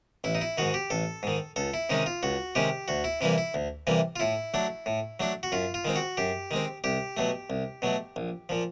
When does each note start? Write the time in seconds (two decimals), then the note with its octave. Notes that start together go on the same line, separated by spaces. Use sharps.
0.24 A1 E4
0.35 D#4
0.41 E4
0.58 G#2 D#3 F#4
0.74 G4
0.90 A1 A4
1.23 G#2 D#3
1.56 C#2 A4
1.74 E4
1.90 C3 D#3 G#3 C#4 D#4
2.06 F4
2.23 C#2 F#4
2.55 C3 D#3 G#3 C#4 G4
2.88 D2 F#4
3.04 E4
3.21 C3 E3 G3 A#3 E4
3.38 E4
3.54 D2
3.87 C3 E3 G3 A#3
4.16 F4
4.20 A2 E4
4.54 F#3 A3 D4
4.86 A2
5.20 F#3 A3 D4
5.43 F#4
5.52 F#2 F4
5.74 F4
5.85 D#3 G#3 C4
5.96 F#4
6.17 F#2 G4
6.51 D#3 G#3 C4
6.84 C2 G4
7.17 B2 F#3 A3
7.50 C2
7.82 B2 F#3 A3
8.16 A#1
8.49 A#2 F3